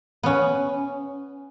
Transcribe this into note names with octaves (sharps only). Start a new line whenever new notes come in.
B3 C#4